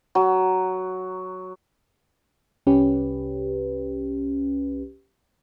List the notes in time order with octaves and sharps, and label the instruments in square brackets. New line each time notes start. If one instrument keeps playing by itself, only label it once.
[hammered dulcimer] F#3
[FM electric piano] C2 C#4 G4 B4